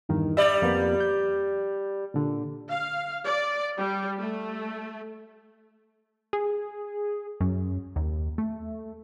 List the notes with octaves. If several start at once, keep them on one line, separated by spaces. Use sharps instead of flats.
E2 G2 D#3
G3 D5 E5
F2 A#3 B3
G6
A#2 D3
F5
D5
G3
A3
G#4
F#2
D#2
A3